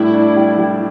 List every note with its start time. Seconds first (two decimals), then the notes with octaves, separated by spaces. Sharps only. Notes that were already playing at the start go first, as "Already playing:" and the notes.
Already playing: A2 G3 D4 E4
0.14 D4
0.36 G3
0.58 G3